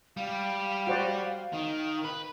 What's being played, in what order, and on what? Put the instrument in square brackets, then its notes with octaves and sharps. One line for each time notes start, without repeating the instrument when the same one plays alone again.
[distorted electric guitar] G3 [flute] F5
[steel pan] F#4 C5 D5
[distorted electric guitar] D#3
B4